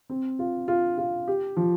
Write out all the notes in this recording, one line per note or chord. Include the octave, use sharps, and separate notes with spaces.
C4
F4
F4
F4
G4
F3